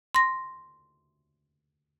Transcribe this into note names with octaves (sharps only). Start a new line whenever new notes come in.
C6 A#6